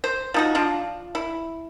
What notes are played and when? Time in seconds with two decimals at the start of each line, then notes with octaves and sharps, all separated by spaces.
0.04 C5
0.34 F3 D#4 F#4
0.55 F3 D4 F4
1.15 E4